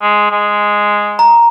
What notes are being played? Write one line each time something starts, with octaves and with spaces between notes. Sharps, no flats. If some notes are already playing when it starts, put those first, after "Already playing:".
G#3
G#3
A#5